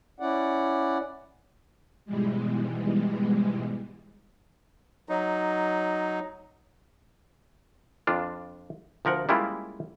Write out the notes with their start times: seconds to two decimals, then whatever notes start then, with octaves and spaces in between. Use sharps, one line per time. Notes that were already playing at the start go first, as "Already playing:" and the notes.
0.20 C#4 E4 D5 F#5
2.05 G#2 B2 E3 G3 G#3
5.09 F#3 D#4
8.07 F2 D4 F4
9.05 D2 F3 A#4 F#5
9.29 G3 G#3 A#3 C#4 E4 F4